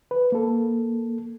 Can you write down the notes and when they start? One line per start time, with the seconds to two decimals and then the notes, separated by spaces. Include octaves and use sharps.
0.11 B4
0.32 A#3 A4